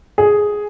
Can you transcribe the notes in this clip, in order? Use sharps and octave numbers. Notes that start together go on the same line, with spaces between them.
G#4